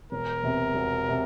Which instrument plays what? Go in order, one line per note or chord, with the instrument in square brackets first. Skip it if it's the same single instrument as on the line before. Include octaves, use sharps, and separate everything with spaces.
[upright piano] E1 [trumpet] A#4
[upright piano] E2 C3
E1
C3